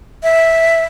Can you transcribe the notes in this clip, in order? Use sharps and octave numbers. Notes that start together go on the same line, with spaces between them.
E5